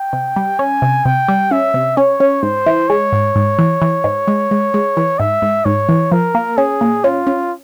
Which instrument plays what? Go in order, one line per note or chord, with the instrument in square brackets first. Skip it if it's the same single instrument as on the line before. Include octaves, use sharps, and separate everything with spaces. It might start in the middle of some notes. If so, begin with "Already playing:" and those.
Already playing: [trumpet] G5
[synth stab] C3
G3
[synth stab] C#4 [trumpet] G#5
[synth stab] C3
[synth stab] C3 [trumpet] G5
[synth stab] G3
[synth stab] C#4 [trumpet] E5
[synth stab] C3
[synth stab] C#4 [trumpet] C#5
[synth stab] C#4
[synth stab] G#2 [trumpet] C5
[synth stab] E3
[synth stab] G#3 [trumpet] C#5
[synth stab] G#2
G#2
E3
E3
G#2
G#3
G#3
G#3
E3
[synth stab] G#2 [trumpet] E5
[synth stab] G#2
[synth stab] G#2 [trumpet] C#5
[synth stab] E3
[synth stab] F3 [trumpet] A#4
[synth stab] A#3
[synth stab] C#4 [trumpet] G#4
[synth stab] A#2
[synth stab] C#4 [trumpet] F4
[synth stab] C#4